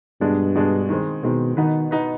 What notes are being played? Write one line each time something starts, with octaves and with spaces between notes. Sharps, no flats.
G2 B2 G#3 D4
B2 G#3 D4
D#3 G#3 C4
B2 D#3 G#3 C4
B2 D#3 B3 D#4 B4
B2 B3 D#4 B4